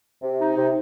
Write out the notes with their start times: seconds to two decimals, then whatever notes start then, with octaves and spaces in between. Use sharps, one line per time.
0.22 C3
0.40 D#4
0.56 C3